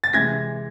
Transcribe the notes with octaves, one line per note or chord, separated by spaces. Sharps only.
A6
C3 E3 G#3 G#6 A#6